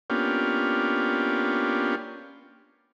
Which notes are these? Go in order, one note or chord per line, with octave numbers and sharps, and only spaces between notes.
A#3 B3 C#4 D4 F4 G4